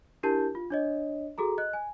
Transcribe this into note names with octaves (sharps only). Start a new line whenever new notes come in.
D4 E4 G4 A#4 A5 G6
F4
D4 C#5 D#5
F#4 G#4 A4 A#5
D#5 F#6
G#5